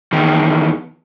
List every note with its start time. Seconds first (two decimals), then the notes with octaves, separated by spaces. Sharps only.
0.13 E2 D#3